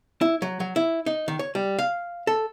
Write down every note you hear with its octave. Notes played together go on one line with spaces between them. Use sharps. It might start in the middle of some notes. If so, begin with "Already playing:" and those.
E4
F#3
F#3
E4
D#4
D#3
C#5
G3
F5
A4